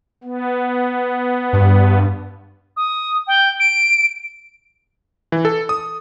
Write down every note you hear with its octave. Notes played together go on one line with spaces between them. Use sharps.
B3
G2
D#6
G5
D7
E3
A4
D#6